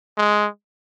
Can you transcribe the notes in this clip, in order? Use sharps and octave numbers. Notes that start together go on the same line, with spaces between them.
G#3